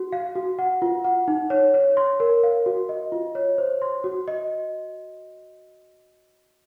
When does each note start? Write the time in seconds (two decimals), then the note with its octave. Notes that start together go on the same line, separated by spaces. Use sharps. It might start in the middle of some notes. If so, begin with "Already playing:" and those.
Already playing: F#4
0.12 F5
0.35 F#4
0.59 F#5
0.82 F4
1.04 F#5
1.28 D#4
1.50 C#5
1.74 C#5
1.97 C6
2.20 A#4
2.43 F5
2.66 F#4
2.89 D#5
3.12 F4
3.35 C#5
3.58 C5
3.82 C6
4.04 F#4
4.28 D#5